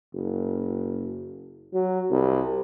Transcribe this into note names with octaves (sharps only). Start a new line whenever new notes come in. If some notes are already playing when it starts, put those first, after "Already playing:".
F#1
F#3
C2